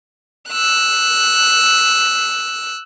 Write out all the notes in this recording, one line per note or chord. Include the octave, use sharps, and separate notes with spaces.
E6 F#6